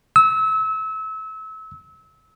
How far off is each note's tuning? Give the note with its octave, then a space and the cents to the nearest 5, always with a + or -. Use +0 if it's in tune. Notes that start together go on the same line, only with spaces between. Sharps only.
E6 -30